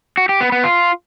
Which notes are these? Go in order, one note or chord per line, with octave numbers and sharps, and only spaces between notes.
F#4
G4
B3
B3
F4